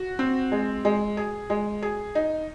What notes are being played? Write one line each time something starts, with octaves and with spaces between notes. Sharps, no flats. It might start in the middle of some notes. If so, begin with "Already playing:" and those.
Already playing: F#4
C4
G#3
G#3
G#4
G#3
G#4
D#4